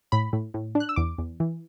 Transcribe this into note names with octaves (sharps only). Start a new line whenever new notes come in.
A2 B5
A2
A2
D4
F#6
E6
E2 D6
E2
E3